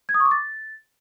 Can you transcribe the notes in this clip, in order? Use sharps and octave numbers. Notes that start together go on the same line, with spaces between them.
G#6
D#6
C#6
D6
A6